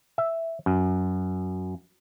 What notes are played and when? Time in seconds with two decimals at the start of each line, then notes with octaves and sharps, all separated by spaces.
0.18 E5
0.66 F#2